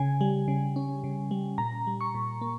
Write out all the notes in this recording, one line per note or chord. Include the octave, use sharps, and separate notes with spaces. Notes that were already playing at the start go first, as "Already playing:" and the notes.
Already playing: C#3 G#5
G3
C#3
C#4
C#3
G3
A#2 A#5
G3
C#6
A#2
A#3